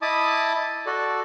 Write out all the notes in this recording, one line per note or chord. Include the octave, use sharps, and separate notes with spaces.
E4 D#5 A5 B5 D6 D#6
F#4 A4 D5